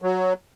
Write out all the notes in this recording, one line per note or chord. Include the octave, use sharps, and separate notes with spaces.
F#3